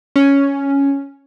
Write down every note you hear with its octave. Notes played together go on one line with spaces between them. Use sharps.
C#4